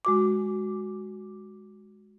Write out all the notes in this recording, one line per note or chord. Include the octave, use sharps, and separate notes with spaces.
G#3 F#4 D6